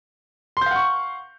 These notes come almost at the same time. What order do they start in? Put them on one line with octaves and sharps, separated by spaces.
C6 G6 F5 F#5 C#6